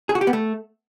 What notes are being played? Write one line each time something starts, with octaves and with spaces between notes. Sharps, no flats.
G#4
F#4
G4
B3
A3